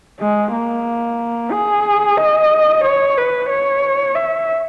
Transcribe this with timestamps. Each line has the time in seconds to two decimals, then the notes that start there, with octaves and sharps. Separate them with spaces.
0.20 G#3
0.53 A#3
1.51 G#4
2.17 D#5
2.84 C#5
3.17 B4
3.50 C#5
4.15 E5